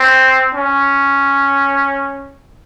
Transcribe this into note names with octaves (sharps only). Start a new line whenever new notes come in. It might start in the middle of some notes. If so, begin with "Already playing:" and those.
Already playing: C4
C#4